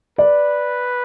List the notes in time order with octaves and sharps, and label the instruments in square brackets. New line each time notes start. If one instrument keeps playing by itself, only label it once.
[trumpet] B4 [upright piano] D5